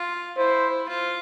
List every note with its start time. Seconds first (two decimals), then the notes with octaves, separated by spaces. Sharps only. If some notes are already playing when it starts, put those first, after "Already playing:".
Already playing: F4
0.38 E4 C5
0.88 F4